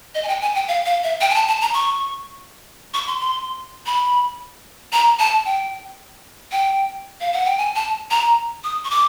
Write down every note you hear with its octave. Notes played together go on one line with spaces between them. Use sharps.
D#5
G#5
G5
G#5
G5
F5
F5
E5
G5
G#5
A5
A5
A#5
C#6
C#6
C6
C6
B5
A#5
A5
G5
G5
F5
F#5
G5
G#5
A5
A#5
D#6
C#6
D6